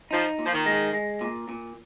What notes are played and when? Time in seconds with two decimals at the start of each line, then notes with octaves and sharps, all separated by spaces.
0.11 F3 D#4
0.39 A#2
0.45 F3
0.52 D#3
0.66 G#3
0.93 G#3
1.21 A#2
1.49 A#2